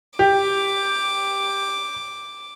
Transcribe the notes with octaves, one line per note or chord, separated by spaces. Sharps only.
G4 D6